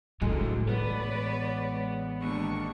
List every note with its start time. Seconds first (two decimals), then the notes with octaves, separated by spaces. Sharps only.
0.22 F2 A2 D3 F#3 G#3 A4
0.69 A1 B3 B4 C#5 D5
2.22 D#2 D4 C#6